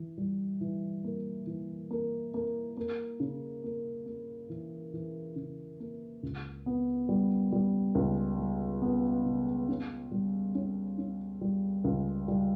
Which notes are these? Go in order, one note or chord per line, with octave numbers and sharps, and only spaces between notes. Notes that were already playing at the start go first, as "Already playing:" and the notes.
Already playing: E3
G3
E3
A#3
E3
A#3
A#3
A#3
C#3
A#3
A#3
E3
E3
C#3
A#3
C#2
B3
G3
G3
C#2
G3
B3
C#3
C#4
G3
C#4
C#4
G3
C#2
G3